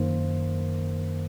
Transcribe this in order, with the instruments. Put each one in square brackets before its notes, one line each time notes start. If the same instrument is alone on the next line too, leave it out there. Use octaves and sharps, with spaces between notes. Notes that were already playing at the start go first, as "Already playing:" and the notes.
Already playing: [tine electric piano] F#2 D#3 A#3 C5